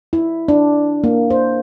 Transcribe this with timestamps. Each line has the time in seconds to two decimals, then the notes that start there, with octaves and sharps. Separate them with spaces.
0.13 E4
0.48 D4
1.04 A#3
1.30 C5